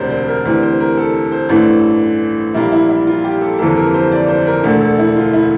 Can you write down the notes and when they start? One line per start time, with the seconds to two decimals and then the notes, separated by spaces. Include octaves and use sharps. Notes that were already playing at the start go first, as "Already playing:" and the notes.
Already playing: E1 D2 C3 A#4 C5 D5
0.10 C5
0.28 A#4
0.45 D2 C3 E3 A#4
0.63 C5
0.80 A#4
0.97 A4
1.32 C5
1.49 A1 G2 E3 A3
2.54 A#1 A#2 G3 A#3 E4
2.72 E4
2.89 E4
3.07 F4
3.24 G4
3.41 A4
3.59 G1 F2 C3 E3 A#3 A4
3.76 A#4
3.94 C5
4.12 D5
4.28 C5
4.47 A#4
4.63 E1 D2 D3 A3 A4
4.81 A4
4.98 E4
5.16 F4
5.33 E4